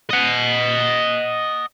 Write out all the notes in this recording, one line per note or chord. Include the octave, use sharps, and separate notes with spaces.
D#5 F#5